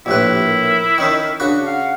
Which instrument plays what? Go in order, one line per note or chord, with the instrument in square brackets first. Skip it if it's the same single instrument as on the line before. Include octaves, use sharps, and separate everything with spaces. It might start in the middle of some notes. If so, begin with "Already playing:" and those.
[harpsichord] A#1 A2 B4 [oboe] E4 [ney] G4
[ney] A#4
[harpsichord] D#3 C#4 D#4
[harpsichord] C#3 F#4 B5 [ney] D4
[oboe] F5 [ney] F#5